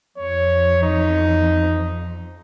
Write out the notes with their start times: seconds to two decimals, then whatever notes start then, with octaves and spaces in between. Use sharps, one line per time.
0.18 F2 C#5
0.83 D#4